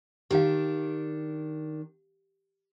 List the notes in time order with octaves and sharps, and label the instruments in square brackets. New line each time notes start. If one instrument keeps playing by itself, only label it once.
[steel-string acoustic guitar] D#3 D4 [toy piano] G4 F5